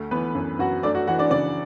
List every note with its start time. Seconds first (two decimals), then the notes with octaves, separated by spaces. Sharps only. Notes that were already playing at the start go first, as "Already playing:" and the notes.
Already playing: D2 A3
0.11 E3 B3 B4
0.35 F#2
0.59 F#2 F#4 F#5
0.83 A3 D4 D5
0.95 F#4 F#5
1.07 E3 F#4 F#5
1.19 D4 D5
1.30 C#3 D4 D5